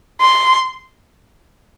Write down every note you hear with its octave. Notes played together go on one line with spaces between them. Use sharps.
C6